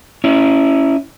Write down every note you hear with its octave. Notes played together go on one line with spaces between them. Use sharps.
C#4 E4